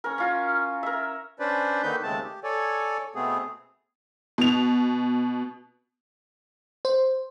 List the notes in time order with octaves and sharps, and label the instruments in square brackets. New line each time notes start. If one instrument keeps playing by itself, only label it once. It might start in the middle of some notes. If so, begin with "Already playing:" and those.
[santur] C#4 A#4
C#4 F4 G#5
A#4 E5
[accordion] C#4 D4 B4 C5 D5
D3 D#3 A#3 D#4 B4 G6
D#2 C#3 G#3 A3 C4 A5
G4
A4 C#5 D5 G#5
B2 A3 B3 C4 G#4
[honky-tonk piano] B2 F7
[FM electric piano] C5